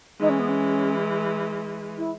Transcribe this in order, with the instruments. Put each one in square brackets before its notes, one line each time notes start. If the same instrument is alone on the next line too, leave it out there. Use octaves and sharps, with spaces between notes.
[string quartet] E3 G#3 [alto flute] D#4
[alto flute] C#4
B3
C#4
E4